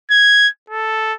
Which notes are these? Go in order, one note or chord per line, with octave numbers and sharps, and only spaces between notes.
G#6
A4